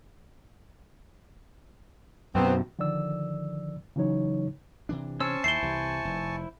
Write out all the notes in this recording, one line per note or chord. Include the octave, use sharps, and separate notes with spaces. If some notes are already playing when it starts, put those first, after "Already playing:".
F#2 B2 F#3 B3 C4
D3 D#3 F3 D5 E6
C#3 E3 F#3 D#4 C#5
C3 E3 D4
C#4 C5 G#5 A5 C#6 E6
D#2 E4 C5 E5 C7 G7
C2 C3 E3
F1